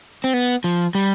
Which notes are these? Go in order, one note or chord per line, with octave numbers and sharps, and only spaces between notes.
C4
B3
F3
G3